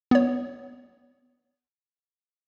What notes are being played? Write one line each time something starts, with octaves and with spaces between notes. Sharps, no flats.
B3 C#5